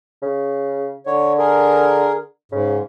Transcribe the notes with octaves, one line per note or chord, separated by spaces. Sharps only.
C#3
D3 C#5
G#4 A#4
G#2 C#3